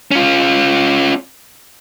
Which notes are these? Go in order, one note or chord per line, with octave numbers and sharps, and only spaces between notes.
C#4 F4